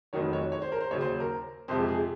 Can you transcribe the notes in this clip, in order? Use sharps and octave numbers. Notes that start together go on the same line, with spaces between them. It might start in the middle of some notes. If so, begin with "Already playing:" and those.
F1 F2 D#3 F#3 C#5
C#5
C#5
C5
A#4
C5
D#2 C#3 F#3 C#5
C5
A#4
F2 C3 F3 G#3 C5
G#4